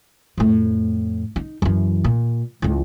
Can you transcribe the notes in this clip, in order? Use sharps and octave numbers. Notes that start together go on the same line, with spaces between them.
F2 A2
D#4
F#2 E3
A#2
C#2 E3